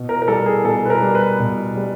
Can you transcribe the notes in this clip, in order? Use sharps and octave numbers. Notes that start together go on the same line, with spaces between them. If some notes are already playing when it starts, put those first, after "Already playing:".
Already playing: B2
A#4
A#4
G3 A4
G#4
B2 A4
B4
A#4
G3
B4
B2
G3